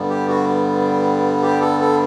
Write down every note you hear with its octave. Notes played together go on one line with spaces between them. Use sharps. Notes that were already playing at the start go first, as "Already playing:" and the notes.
Already playing: G2 D3 G3 B3
G4
F#4
G4
A4
A4